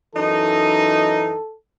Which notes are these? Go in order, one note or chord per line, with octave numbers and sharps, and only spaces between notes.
F#2 E3 D#4 A4